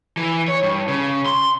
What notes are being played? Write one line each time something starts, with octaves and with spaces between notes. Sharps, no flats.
E3
C#5
G2
C#3
C6